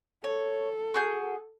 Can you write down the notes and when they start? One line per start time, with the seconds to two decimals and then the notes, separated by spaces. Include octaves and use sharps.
0.24 A4 C#5
0.94 F#4 G#4 G6